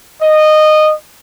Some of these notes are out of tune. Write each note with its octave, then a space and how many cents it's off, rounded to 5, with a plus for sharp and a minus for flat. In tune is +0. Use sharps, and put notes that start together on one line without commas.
D#5 -15